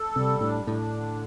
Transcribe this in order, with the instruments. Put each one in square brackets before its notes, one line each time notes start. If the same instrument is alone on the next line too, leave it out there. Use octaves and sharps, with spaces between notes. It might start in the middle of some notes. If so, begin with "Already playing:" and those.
Already playing: [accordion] A4
[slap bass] C3 [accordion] G3
[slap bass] A2 [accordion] D4
[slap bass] A2 [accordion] D4
[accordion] D3